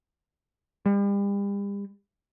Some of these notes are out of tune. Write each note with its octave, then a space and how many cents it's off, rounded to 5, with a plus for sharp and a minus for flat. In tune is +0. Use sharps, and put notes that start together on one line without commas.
G3 +40